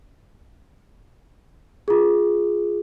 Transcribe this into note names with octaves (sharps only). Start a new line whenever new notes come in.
F4 G#4